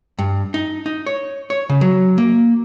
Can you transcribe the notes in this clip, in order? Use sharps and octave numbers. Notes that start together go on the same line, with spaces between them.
G2
D#4
D#4
C#5
C#5
C#3
F#3
A#3